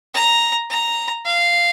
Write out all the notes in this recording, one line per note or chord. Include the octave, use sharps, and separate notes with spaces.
A#5
A#5
F5